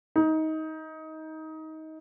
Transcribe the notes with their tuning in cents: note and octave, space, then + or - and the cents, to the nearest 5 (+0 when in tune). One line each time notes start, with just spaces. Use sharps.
D#4 +20